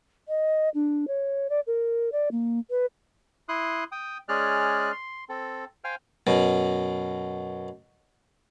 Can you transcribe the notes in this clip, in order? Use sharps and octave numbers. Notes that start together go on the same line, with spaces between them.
D#5
D4
C#5
D5
A#4
D5
A#3
B4
E4 C6 D#6 F#6
G5 D#6
G#3 C#4 G#4 D5 F6 F#6
C6
C4 A4
C5 F5 G5 G#5 F6
F#2 B2